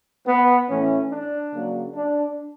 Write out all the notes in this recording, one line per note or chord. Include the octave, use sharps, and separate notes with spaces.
B3
A2 E3 A3 C#4
D4
C#3 F#3 A#3
D4